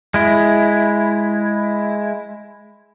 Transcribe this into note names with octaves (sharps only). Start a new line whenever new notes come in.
G#3 E4